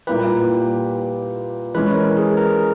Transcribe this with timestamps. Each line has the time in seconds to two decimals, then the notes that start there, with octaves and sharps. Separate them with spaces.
0.07 A#2 G3 A#3 E4 G4 B4
1.75 E3 G#3 C#4 B4
1.95 A#4
2.17 G#4
2.37 A#4